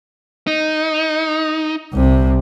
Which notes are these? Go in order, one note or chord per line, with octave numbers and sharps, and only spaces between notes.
D#4
C2 C3